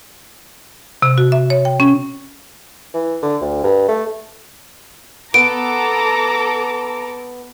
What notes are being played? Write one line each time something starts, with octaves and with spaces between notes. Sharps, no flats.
C3
F#4
E5
C#5
G5
C#4
E3
D3
D2
G2
A3
B3 A4 A#5 D6 D7